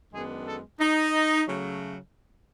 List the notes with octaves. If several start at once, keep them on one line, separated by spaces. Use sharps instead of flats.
F#2 D#3 G#3 B3 D4 G#4
A4
D#4
C#3 F#3 A3